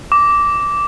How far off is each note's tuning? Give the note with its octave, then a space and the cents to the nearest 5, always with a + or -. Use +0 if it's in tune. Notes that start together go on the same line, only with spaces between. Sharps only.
D6 -10